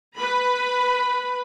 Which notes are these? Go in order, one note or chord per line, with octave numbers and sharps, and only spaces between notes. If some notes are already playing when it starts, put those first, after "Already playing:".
B4 B5